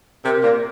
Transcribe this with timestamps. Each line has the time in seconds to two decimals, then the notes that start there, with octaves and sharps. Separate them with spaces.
0.24 C3 A#4
0.43 A#2